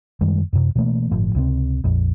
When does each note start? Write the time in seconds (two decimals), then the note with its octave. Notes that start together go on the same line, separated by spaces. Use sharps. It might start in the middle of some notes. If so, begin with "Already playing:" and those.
0.21 F#2 D#3 G3 G#3
0.53 F#2 C3
0.75 B2 E3 A3 A#3
1.11 G1 A2 F3
1.35 C#2 C3 C4
1.84 A#1 F2